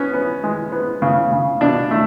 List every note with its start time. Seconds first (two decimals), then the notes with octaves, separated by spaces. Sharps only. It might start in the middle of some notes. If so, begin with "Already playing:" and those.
Already playing: B3 C#4
0.14 B3
0.44 G#3
0.72 B3
1.02 C#3
1.32 C#3
1.61 B2 D4
1.91 A3